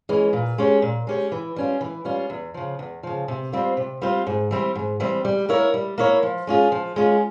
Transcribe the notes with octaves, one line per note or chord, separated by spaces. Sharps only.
E3 G#3 C#4
A#2
G#3 C#4 G4 C#5
A#2
G#3 C#4 G4 C#5
E3
G3 C#4 F4
E3
G3 C#4 F4
E2
C#3 F3
E2
C#3 F3
C3
G3 C4 F4 C5
C3
G3 C4 F4 C5
G#2
E3 G3 C4
G#2
E3 G3 C4
G3
A#3 E4 A#4 C#5
G3
A#3 E4 A#4 C#5
F3
G#3 C#4 F4 G#4
F3
G#3 C#4 F4 G#4